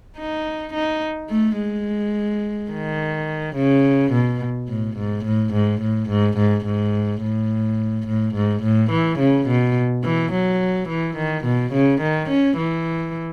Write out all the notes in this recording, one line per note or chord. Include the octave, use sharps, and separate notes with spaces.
D#4
D#4
A3
G#3
D#3
C#3
B2
A2
G#2
A2
G#2
A2
G#2
G#2
G#2
A2
A2
G#2
A2
E3
C#3
B2
E3
F#3
E3
D#3
B2
C#3
D#3
C#4
E3